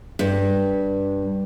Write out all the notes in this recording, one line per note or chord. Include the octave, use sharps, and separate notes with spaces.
G2